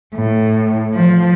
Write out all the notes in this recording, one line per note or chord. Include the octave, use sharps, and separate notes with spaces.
A2
F3